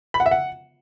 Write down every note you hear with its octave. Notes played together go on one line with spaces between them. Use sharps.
B5
F#5
E5
F#5